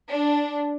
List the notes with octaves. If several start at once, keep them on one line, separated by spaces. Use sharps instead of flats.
D4